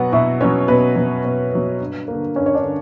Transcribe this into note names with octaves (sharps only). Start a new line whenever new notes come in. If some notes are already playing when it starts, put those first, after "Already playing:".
Already playing: B2 F#3 B3 F#4 F#5
B2 E4 E5
F#3 B3 C#4 C#5
B2 B3 B4
F#3 B3
B2
F#3 B3
G2
D3 A#3
G2 C#4 C#5
C#5
D4 D5
D3